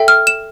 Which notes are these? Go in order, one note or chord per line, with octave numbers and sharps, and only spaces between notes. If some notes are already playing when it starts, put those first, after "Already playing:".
Already playing: A4 E5 G5
F6
E7